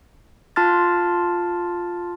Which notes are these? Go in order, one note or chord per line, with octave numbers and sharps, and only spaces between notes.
F4 A5 C6 F6 A6